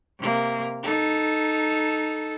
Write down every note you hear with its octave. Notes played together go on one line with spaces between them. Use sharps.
C3 A#3
D#4 A4